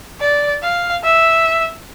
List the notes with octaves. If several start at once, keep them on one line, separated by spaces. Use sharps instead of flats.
D5
F5
E5